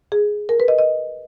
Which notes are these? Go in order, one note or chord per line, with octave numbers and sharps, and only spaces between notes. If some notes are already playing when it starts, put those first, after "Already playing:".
G#4
A#4
B4
D#5
D#5